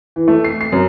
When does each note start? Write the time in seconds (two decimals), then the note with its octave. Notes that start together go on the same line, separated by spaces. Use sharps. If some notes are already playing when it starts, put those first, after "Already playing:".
0.16 E3
0.28 A3
0.45 C7
0.61 C7
0.72 F#2